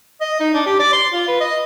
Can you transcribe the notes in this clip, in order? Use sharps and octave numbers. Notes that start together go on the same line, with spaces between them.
D#5
D#4
D4
G4
D5
C6
F4
B4
D#5